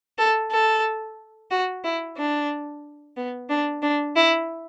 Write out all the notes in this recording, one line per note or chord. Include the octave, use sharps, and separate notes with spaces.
A4
A4
F#4
E4
D4
B3
D4
D4
E4